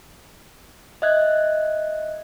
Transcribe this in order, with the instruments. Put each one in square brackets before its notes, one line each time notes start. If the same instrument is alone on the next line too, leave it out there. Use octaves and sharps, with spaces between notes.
[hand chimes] D#5 E5 F#6 G#6